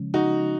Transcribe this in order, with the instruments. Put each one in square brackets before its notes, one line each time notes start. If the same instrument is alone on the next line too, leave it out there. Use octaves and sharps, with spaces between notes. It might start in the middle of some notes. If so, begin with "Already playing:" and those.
Already playing: [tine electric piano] C#3 F3 G#3 C#4
[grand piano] D#4 F#4